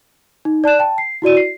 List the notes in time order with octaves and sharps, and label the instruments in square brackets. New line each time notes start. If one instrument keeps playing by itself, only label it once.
[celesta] D#4
D5 A5 F#6 E7
G5 A5
C7
E4 F#4 D5 D#7
C7